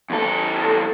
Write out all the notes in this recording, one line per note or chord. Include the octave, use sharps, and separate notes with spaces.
E2 A4